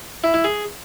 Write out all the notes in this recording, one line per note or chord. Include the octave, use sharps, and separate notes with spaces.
E4
E4
G#4